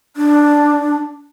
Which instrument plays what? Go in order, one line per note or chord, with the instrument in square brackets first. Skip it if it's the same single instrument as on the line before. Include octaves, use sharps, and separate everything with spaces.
[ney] D4